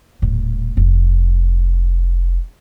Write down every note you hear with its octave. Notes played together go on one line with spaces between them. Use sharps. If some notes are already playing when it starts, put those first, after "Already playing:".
D#1 A2
F1